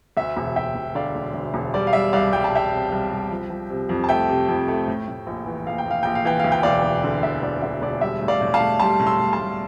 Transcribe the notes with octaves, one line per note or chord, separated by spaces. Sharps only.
D2 E5
E1
E1 E5 G5
E1
D3 D5 F5
E1
D2
E1
G3 D5
F5
G3 E5
C2 D5 F5
G3 G5
A5
C2 E5 G5
C3
C2
C2
F3
F3
C3
F2
A5
A3 E5 G5
C3
F2
A3
A2
A2
A#1
E3
A#1 F5
G5
A#1 F5
A#1 G5
F5
E3 G5
D2 F5
G5
E1 D5 F5
E1
D3
E1 E5
D2 D5
D3 E5
E1 D5
G3 E5
A2
D5 F5
A2
F5 A5
A2
G3 A5 C6
A2
C6 E6
A2
A5 C6
A2